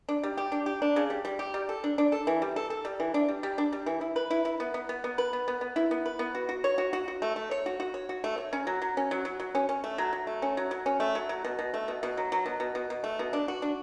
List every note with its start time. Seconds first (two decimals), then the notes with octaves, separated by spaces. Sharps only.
0.09 D4
0.24 G3
0.38 G4
0.52 D4
0.66 G4
0.82 D4
0.96 C#3
1.10 G3
1.25 G3
1.39 G4
1.54 G3
1.69 A4
1.84 D4
1.98 D4
2.12 A4
2.27 E3
2.42 G3
2.56 A4
2.70 A4
2.85 G3
3.00 E3
3.14 D4
3.29 G3
3.43 G3
3.58 D4
3.73 G3
3.86 E3
4.01 E4
4.16 B4
4.30 E4
4.45 E4
4.60 B3
4.74 B3
4.89 B3
5.04 B3
5.18 B4
5.33 B3
5.48 B3
5.61 B3
5.76 E4
5.91 B3
6.06 B4
6.19 B3
6.35 F#4
6.49 F#4
6.64 C#5
6.78 F#4
6.93 F#4
7.08 F#4
7.22 A3
7.36 A3
7.51 C#5
7.66 F#4
7.80 F#4
7.94 C#5
8.09 F#4
8.24 A3
8.38 C#5
8.53 C#4
8.67 F#3
8.82 F#3
8.97 C#4
9.11 F#3
9.25 F#3
9.40 F#3
9.55 C#4
9.69 C#4
9.84 A3
9.98 F#3
10.13 F#3
10.27 A3
10.42 C#4
10.57 F#3
10.71 F#3
10.86 C#4
11.00 A3
11.15 F#3
11.29 F#3
11.45 B2
11.59 B2
11.74 A3
11.88 B2
12.03 B2
12.17 F#3
12.32 F#3
12.46 B2
12.60 B2
12.75 B2
12.90 B2
13.04 A3
13.19 B2
13.33 D4
13.48 F#4
13.62 D4